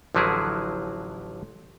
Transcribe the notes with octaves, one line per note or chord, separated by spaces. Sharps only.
A1 D3 F3 F#3 E4 G#4